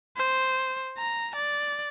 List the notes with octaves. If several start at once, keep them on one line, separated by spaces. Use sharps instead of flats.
C5
A#5
D5